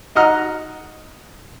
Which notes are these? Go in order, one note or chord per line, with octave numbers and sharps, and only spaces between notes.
D#4 F#4 D#5 F#5 A#5 F6